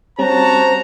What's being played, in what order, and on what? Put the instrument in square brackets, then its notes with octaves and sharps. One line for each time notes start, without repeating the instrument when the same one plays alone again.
[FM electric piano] G3 C4 C#4 [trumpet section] F#4 A5 [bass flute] C5 [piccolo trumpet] A#5